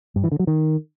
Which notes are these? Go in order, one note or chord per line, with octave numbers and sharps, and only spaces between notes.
G2
E3
D3
F#3
D#3